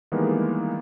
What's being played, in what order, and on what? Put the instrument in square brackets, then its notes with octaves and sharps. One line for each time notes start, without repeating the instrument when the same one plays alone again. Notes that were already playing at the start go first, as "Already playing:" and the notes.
[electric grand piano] D#3 E3 G3 G#3 A#3 B3